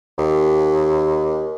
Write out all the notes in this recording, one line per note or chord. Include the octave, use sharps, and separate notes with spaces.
D#2